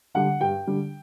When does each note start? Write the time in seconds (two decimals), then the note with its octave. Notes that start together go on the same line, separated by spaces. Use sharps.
0.15 D3 G3 F#5
0.41 G2 G5
0.67 D3 G3